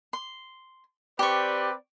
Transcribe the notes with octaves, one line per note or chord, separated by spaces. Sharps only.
C6
C4 G4 B4 D5 C#6